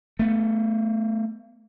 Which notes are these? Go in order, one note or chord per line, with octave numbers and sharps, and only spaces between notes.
A3 B3